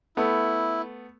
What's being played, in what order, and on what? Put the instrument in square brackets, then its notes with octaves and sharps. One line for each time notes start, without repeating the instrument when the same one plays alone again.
[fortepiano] A3 B3 [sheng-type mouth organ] E4